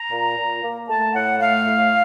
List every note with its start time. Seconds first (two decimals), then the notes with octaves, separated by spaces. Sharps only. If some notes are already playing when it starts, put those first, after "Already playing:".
Already playing: A#5
0.11 A#2
0.36 A#2
0.63 A#3
0.89 A3 A5
1.14 A2 F#5
1.40 A3 F5
1.66 A2